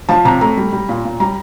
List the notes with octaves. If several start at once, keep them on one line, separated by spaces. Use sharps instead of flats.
F3 A5
C3 A#5
A3 A#5
G3
G3
A#2
A#2
G3 A#5